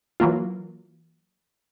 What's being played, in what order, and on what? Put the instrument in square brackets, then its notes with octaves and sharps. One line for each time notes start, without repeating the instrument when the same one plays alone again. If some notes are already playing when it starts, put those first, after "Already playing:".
[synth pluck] E3 F#3 A#3 F4